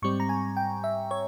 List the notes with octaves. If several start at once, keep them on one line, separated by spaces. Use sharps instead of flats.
G#2 G3 C4 C#6
A#5
G#5
G5
E5
C#5